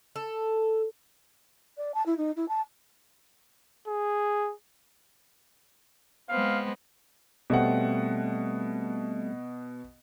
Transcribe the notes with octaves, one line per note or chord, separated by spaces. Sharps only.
A4
D5
A5
E4
D#4
E4
A5
G#4
G#3 B3 C4 F5
B2 G3 A3 C4 F#5